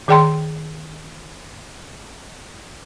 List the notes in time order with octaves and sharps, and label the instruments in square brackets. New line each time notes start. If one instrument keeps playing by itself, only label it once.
[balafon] D#3 G#4 D5 G5 A#5 C6